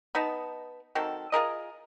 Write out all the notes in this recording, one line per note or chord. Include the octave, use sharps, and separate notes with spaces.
B3 D#4 D#5 A5
D#3 F#3 C4 A4
F4 G#4 A#4 D#5